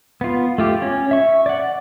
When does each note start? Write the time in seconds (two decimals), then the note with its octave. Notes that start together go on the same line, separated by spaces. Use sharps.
0.21 B3 F4
0.58 A3 F4 G4
0.82 C#4
1.11 E5 C#6
1.46 D5 F#5